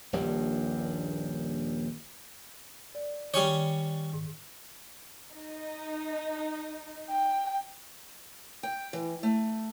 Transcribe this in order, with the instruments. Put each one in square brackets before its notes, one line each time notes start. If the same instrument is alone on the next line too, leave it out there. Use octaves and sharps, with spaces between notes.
[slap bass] D#1 A#1 G2 G3
[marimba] D5
[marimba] D#3 [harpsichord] G3 C#4 C#5
[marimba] G#2
[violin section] D#4
[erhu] G5
[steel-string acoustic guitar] G5
E3
A3